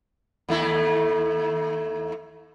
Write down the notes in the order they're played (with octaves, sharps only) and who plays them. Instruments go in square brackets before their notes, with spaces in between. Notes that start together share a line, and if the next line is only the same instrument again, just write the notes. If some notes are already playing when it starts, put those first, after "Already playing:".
[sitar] D#2 A3 E4